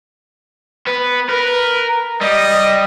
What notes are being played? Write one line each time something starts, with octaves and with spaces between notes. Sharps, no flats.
B3 B4
A#4 B4
G3 D#5